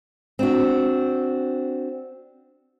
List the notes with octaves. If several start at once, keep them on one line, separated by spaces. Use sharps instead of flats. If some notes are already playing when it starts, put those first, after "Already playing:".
C4 D4 F#4